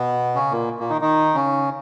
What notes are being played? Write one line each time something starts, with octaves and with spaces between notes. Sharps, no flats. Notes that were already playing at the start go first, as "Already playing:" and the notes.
Already playing: B2 B3
C#3 C#4
A#2 A#3
A#2 A#3
D#3 D#4
D#3 D#4
C#3 C#4